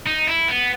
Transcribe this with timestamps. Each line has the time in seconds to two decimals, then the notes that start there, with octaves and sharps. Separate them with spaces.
0.06 D#4
0.27 E4
0.48 B3